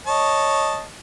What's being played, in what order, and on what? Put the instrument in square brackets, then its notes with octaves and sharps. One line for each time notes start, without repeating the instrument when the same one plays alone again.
[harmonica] C#5 D#5 A5